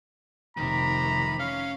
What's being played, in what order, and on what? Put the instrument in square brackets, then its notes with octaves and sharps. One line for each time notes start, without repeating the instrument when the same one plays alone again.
[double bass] F1 C3 [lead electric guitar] D#3 [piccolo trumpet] A#5 [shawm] B5
[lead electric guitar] C#4 [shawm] F5